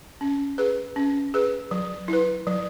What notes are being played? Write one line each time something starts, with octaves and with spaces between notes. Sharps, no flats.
C#4
G#4 B4
C#4
G#4 B4
F#3
E4 B4
F#3